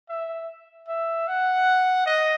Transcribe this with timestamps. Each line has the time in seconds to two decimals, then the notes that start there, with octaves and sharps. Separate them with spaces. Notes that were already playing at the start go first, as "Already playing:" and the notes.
0.09 E5
0.88 E5
1.28 F#5
2.06 D#5